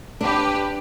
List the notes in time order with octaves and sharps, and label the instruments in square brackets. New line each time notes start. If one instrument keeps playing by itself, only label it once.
[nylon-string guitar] D4 [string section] G4 B4